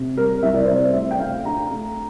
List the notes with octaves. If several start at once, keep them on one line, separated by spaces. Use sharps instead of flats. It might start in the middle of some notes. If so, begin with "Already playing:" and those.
Already playing: C3
G3 A#4
C2 E5
D5
C3 C5
D5
D5
A3 E5
G5
A3 F5
D4 A#5
A3